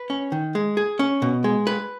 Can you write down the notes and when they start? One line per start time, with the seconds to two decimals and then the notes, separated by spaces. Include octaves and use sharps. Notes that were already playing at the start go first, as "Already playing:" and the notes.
Already playing: B4
0.10 C#4
0.32 D#3
0.55 G#3
0.77 G#4
0.99 C#4
1.22 B2
1.44 G#3
1.67 B4